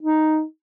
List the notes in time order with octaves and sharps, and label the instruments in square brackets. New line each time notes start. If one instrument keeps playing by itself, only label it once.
[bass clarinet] D#4